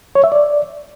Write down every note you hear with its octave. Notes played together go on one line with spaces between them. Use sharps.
C#5
E5
D5